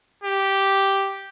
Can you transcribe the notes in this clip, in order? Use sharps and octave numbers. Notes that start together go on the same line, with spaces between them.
G4